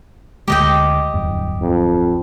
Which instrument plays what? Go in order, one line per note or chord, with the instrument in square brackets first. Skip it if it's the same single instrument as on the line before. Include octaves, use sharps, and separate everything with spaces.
[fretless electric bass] D2 D3 G#3 [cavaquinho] G4 D#5 G5
[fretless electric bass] D1 E2 G2
[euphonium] F2